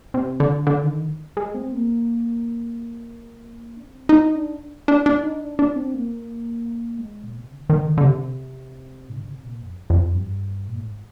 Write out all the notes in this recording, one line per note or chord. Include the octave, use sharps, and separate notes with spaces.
C3
D3
D3
D#3
G#3
C4
A#3
D4
C4
D#4
D4
D4
D4
D#4
D4
D4
C4
A#3
G#3
A#2
C3
D3
D#3
D3
D3
C3
G#2
D3
C3
A#2
F2
F2
G2
A#2
G#2